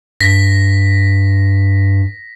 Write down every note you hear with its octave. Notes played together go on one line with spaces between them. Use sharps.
G2 A#6 B6